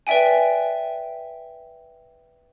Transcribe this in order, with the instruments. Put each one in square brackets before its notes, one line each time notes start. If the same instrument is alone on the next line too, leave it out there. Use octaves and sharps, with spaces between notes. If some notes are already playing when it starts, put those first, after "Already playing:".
[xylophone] B4 D5 E5 G5 G#5